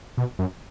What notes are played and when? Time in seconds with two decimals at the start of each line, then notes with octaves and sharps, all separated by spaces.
0.17 B2
0.39 F#2